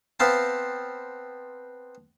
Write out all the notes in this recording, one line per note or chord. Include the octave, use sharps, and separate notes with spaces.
B3 C4 F5 A5